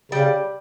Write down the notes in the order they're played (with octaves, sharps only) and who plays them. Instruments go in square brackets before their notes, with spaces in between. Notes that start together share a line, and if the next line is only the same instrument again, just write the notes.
[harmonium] C#3 [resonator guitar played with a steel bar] G3